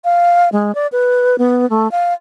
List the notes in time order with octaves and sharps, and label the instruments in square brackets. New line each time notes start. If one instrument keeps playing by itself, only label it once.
[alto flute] F5
G#3
D5
B4
B3
A3
F5